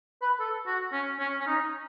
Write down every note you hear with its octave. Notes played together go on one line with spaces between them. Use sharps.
B4
A4
F#4
C#4
C#4
C#4
D#4